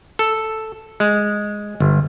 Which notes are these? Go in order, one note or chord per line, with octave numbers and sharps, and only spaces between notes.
A4
G#3
G1